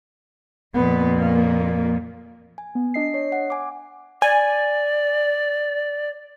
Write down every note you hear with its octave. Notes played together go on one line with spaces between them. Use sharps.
F2 A#2 B3
A#3
G#5
B3
D4 D#5 C7
C#5
F#5
G#5 D6
D5 G#5